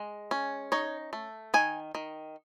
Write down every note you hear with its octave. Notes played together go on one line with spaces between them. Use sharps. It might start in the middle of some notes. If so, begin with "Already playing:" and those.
Already playing: G#3
C#4
D#4 C#5
A3
D#3 G#5
D#3